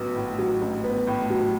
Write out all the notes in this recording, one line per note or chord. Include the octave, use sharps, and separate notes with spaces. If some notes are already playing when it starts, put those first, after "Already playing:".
Already playing: A1 F#3 B3
A2
F#3
A1
B3
A2
F#3